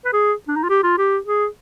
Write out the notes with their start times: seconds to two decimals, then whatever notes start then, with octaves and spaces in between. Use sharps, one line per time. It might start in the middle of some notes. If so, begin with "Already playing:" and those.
0.05 B4
0.13 G#4
0.48 D4
0.56 D#4
0.63 F4
0.69 G4
0.83 F4
0.98 G4
1.26 G#4